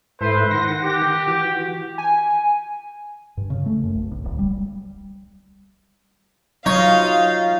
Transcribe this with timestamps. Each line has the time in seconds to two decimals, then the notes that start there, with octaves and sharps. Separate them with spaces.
0.21 G#2 E4 A4 B4 C5
0.51 D#3 F#5 A#6
0.84 G4
1.27 E3 F#4
1.98 G#5
3.37 G2
3.50 C#3
3.66 A3
3.83 F#2
3.95 B1
4.11 B1
4.25 D1
4.39 G3
6.66 F#3 D#4 F4 C#5 D#5 F5